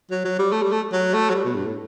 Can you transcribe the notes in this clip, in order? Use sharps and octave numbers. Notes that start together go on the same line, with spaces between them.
F#3
F#3
G3
A3
G3
A3
F#3
A3
F#3
G3
B2
G2
A2